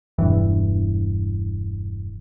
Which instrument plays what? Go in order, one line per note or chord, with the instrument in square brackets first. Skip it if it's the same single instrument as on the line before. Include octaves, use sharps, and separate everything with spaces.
[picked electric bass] E1 G2 E3